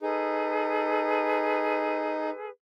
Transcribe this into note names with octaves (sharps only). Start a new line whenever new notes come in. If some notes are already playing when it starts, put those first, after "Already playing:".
D#4 G#4 A4 B4